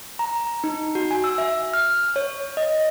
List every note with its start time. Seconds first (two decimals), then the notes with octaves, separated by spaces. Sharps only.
0.19 A#5
0.64 D#4
0.95 F#4
1.11 G#5
1.24 E6
1.38 E5
1.74 F6
2.16 C#5
2.57 D#5